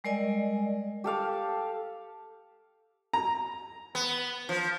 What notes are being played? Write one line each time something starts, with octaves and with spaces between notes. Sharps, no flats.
G3 G#3 A#4 D5 D#5 G#5
G4 A4 F5 D6
A#5
B3
F3